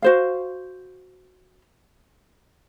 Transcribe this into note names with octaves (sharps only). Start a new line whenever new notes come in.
F#4 C5 F5